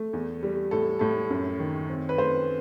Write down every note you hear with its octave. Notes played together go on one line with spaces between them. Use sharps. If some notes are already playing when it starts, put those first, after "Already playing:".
Already playing: A3
E2
G3
A2 A4
A2 A4
F#2
D#3
C4
B4
A3 C5